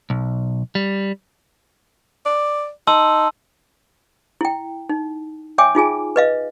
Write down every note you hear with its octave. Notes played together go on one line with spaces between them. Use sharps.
B1
G3
D5
D#4 A5 C6 E6
E4 G5
D#4
C#5 E5 G5 G#5 D6
D#4 F4 G#4 G#5
B4 D#5 F5